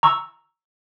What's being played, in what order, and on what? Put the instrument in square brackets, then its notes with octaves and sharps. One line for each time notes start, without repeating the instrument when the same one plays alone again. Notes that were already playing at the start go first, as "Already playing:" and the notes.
[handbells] A#5 C#6 E6